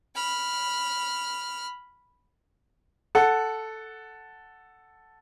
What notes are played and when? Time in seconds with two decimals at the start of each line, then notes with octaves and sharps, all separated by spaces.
0.15 B5 F6
3.15 A4 F#5